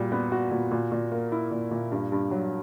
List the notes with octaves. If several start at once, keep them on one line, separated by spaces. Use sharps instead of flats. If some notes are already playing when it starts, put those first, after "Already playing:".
Already playing: A#2 G3 F#4
B3
F#4
A#2
A#2
A#2
A#3
E4
A#2
A#2
G2
G2
F#3